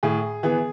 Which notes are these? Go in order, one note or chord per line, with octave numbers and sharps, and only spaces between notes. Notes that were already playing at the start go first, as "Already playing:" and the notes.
A2 G#4
E3 B3 G#4